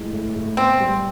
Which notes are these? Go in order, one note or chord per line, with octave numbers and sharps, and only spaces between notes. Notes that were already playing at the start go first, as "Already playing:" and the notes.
Already playing: A2 E3 G#3
A2
A2
B3 C4
G3